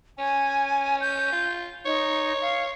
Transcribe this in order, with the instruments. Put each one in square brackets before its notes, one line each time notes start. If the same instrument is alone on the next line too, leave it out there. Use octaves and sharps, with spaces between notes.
[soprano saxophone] C#4 [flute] G#5
[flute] G6
[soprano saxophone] F4
[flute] D#4 [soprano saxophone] C#5
[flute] F5